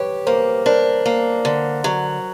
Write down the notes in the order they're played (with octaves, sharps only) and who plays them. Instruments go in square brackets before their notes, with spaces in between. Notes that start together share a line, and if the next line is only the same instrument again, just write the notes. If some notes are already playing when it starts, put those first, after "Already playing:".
Already playing: [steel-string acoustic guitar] G4 [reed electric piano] B4 C#5
[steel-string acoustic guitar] A#3 [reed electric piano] A#4 C5
[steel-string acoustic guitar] D4 [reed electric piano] A#4 C5
[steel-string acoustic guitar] A#3
D3
F#3